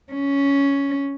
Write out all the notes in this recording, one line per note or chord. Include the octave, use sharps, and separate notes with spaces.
C#4